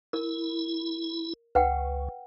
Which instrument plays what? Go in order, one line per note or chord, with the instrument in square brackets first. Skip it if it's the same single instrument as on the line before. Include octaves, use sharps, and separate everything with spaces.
[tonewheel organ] E4 [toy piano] A#4
[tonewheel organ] C#2 [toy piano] B4 F#5 G5